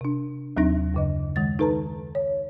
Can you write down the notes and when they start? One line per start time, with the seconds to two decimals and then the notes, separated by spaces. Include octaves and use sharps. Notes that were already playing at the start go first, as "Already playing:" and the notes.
0.01 C3 D4
0.57 D#2 F#3 C4 D4 D#4 A#6
0.94 F#2 C#3 D#5
1.36 D#3 G#3 A6
1.59 D#4 A4 B4 A5 A#5
2.15 C#5